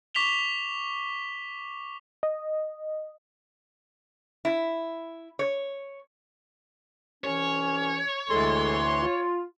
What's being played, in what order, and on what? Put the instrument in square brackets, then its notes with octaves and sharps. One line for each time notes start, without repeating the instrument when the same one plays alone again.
[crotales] C#6 D6 B6 E7 F7 G7
[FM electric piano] D#5
[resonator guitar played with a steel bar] E4
C#5
[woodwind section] C2 E3 C#4 [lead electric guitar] C#5
[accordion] D2 E3 C6 [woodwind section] G#3 A4
[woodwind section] F4